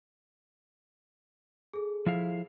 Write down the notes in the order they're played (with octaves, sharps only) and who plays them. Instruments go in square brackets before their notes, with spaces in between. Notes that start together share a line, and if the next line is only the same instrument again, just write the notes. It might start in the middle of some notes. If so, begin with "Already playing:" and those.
[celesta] G#4 A4
[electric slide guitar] F3 E4 F5